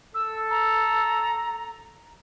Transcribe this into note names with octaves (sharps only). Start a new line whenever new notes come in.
A4 E6
A#5